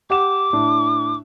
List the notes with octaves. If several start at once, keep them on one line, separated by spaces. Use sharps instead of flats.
G4 F#5 D6 E7
A2 D4